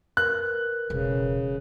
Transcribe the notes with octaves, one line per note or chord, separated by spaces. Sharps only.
A#4 B4 F#6
E1 C#3